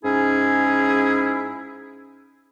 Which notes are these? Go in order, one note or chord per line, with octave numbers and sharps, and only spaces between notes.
G#2 C#4 D#4 E4 G#4